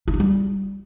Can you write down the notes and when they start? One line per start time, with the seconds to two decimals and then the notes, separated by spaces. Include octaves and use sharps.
0.08 E4
0.14 D#4
0.20 G3